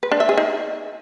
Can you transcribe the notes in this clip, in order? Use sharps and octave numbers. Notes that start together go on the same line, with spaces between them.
B4
D4
E5
G#4
D#4